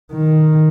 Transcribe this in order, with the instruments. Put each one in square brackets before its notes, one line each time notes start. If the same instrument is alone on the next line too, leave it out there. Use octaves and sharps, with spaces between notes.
[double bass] D#3